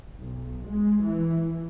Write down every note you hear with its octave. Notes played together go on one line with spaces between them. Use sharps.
B1
G#3
E3